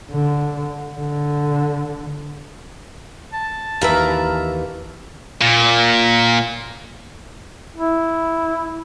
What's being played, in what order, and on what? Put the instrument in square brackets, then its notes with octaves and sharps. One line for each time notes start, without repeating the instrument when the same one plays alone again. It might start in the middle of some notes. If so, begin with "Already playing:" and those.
[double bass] D3
D3
[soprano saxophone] A5
[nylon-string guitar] D#2 E3 B4 [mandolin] A#4 E5
[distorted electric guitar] A#2
[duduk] E4